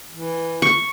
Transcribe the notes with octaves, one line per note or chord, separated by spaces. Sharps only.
E3
C#6